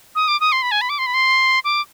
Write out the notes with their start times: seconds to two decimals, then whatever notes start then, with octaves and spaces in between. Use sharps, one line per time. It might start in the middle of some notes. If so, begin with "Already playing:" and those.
0.15 D#6
0.28 D6
0.40 D#6
0.52 C6
0.62 B5
0.71 G#5
0.81 B5
0.89 D6
0.99 C6
1.06 B5
1.14 C6
1.64 D6